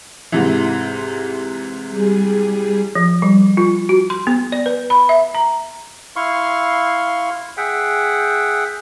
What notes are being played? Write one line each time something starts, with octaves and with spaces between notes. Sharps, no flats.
G#2 C3 E3
G3 G#4
F3
G3
F4
F#4
C6
B3
D5
B4
B5
E5
A#5
E4 F5 C6 C#6
G#4 E5 F#5 G5